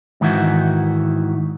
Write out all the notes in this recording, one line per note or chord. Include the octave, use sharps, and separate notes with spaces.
G#2 D#3 E3 E4 F#4